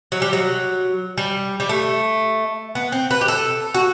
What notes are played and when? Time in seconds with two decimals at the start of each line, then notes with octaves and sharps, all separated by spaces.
0.12 F#3
0.22 G3
0.33 F#3
1.18 G3
1.60 G3
1.69 A3
2.75 B3
2.92 C4
3.11 B4
3.21 G4
3.28 A4
3.74 F#4